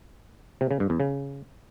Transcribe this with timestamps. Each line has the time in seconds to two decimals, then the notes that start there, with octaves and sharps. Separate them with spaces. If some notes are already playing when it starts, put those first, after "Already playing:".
0.61 C3
0.71 C#3
0.80 G2
0.90 E2
1.00 C#3